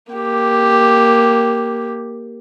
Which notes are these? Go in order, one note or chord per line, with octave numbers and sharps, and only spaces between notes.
A#3 G4